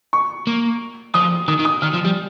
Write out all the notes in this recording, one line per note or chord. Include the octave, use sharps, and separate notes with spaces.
C#6
A#3
F3 D#6
D#3 D#6
D#3
D#6
D#3 F6
F3
G3